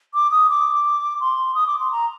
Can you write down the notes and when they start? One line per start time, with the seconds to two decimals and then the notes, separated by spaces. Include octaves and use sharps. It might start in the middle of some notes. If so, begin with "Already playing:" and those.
0.14 D6
0.31 D#6
0.50 D6
1.20 C6
1.55 D#6
1.67 D6
1.79 C6
1.92 A#5